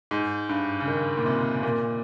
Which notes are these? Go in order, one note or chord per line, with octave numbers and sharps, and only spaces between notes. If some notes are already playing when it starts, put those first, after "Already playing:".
G#2
G2
C#3
D#3
A#2
C3
A#2